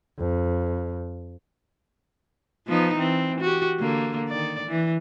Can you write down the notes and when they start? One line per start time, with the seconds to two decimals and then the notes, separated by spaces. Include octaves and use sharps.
0.19 F2
2.67 F3 B3 D#4
2.97 E3 C4
3.41 F#4 G4
3.79 D3 A#3
4.29 D#3 D5
4.68 E3